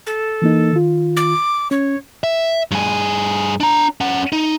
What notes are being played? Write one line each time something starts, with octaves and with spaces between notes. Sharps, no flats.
A4
E3 A#3 D#4
D#3 F4
D6
C#4 C#5
E5
G2 G#4
D4 A#5
C#4 F#5
D#4